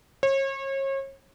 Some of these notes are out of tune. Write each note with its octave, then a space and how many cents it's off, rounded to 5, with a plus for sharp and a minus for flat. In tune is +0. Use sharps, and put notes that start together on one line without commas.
C#5 -35